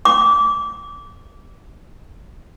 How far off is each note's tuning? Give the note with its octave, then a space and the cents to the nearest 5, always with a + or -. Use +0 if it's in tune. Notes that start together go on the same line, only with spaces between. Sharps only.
D6 -20